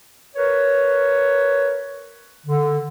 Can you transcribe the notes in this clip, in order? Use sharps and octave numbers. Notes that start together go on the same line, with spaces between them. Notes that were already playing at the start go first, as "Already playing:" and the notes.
A#4 B4 C#5
D3